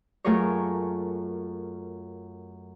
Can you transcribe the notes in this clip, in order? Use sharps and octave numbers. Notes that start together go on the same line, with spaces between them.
F#2 A3 F4 G#4 A#4 C#5